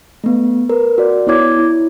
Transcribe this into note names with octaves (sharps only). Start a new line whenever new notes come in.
A3 B3
A#4 B4
F#4 D5
B3 E4 C#5 D6 G#6
E4